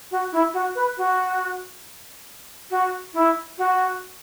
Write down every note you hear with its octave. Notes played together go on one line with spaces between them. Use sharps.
F#4
E4
F#4
B4
F#4
F#4
E4
F#4